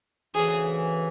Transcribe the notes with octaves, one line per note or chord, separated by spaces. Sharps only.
D2 C#3 E3 G#4